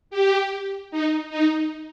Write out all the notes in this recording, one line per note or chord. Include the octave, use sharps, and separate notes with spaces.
G4
D#4
D#4